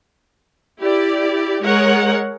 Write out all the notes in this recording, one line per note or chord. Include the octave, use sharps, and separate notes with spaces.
E4 G4 D5
G#3 A#4 C#5 F#5